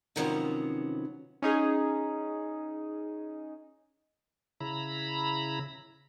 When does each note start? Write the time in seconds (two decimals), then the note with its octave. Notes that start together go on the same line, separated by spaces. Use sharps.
0.16 C3 D#3 F3 F#3 B3 C#4
1.42 C#4 D#4 G#4
4.60 C#3 E4 A#5 B5